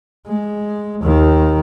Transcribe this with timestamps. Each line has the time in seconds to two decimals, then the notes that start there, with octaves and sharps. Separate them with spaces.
0.27 G#3
1.02 D#2 D#3